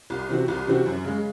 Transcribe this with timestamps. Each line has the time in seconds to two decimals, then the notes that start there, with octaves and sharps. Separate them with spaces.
0.10 C2
0.29 C3 E3 C4 F#4
0.48 C2
0.67 C3 E3 C4 F#4
0.86 F#2
1.05 C#3 G#3